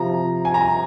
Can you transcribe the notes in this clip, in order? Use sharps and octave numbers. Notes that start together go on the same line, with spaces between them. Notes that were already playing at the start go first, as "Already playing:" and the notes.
Already playing: C3 F3 A#5
G#5
A#5